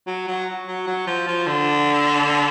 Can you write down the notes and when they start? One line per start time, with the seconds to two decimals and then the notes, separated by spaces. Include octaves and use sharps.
0.07 F#3
0.27 F#3
0.67 F#3
0.87 F#3
1.07 F3
1.27 F3
1.47 D3